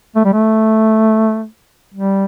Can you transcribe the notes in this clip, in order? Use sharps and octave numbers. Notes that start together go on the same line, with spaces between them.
A3
G3
A3
G3